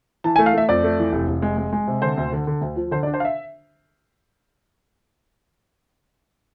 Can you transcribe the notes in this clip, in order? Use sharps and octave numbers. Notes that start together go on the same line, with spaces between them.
E3 A5
G#5
A3
F5
A3 E5
F2 D5
A3
E3
F1
F1
G#3
G#3
G#3
C3
D3 C5
D2
D3
D3
D2
F3
D3 C5
D5
D4
C5
F5
E5